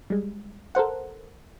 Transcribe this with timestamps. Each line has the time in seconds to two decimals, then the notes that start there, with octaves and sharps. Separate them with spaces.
0.10 G3 G#3
0.75 A4 A#4 C5 F#5